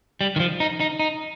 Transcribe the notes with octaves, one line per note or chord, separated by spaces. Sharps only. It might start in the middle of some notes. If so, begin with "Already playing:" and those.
G3
D#3
F3
D#4
D#4
D#4